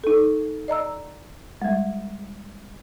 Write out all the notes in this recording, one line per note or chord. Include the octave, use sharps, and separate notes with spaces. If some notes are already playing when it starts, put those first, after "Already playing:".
D#4 A4
D5 D#5 A#5 E6
G3 G#3